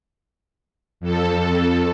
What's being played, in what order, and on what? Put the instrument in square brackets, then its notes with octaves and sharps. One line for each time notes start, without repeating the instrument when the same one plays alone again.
[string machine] F2 A4